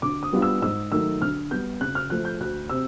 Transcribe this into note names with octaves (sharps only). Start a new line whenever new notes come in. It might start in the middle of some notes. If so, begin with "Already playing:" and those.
D3 D6
D#6
G3 B3 D4 F4
E6
G#2 E6
D#3 F#3 A3 E6
D3 F6
G3 B3 G6
C#3 F#6
F6
F3 A3 F#6
G6
D2 F#6
C3 E6